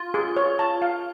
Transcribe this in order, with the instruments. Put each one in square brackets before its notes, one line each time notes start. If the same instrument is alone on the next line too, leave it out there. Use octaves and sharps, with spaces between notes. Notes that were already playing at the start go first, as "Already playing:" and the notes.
Already playing: [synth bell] F4
[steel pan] G#4
C#5
A5
F5